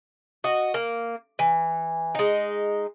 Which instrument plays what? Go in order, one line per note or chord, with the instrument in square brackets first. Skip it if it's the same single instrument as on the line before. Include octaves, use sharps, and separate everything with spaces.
[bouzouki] F#4 D#5
A#3
E3
G#3 D#4